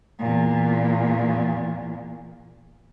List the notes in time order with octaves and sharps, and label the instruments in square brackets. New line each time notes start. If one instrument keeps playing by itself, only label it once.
[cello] E2 A#2